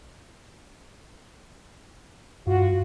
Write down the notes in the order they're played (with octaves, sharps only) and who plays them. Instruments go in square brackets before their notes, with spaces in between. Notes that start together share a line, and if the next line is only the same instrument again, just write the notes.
[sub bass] G2 [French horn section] F4 F#4